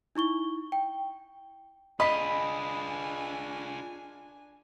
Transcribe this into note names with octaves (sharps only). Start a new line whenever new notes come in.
D#4 E4 C#6 G7
G5
D4 F4 G#4 D#5 G#5 B5 B6